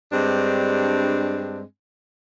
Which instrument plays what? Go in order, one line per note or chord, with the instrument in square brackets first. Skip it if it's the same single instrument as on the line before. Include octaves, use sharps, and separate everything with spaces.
[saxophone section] G2 G#3 C4 D4